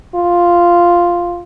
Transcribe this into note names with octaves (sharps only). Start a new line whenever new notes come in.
F4